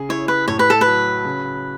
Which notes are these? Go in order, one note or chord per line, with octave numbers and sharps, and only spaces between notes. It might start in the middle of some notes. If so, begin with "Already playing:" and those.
Already playing: C#3 G#4
E4 C#5
B4
A2 C#5
B4
A4
B4
F#3
C#3